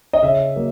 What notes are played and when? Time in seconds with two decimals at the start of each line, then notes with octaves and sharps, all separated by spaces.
0.13 D#5
0.22 C#3 E5
0.56 F#3 A#3